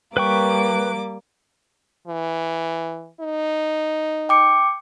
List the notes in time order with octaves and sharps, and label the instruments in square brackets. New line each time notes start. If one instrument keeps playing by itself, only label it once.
[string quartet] G3 A#3 D6 [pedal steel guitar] B4 G5 C#6
[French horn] E3
D#4
[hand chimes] G5 D6 C#7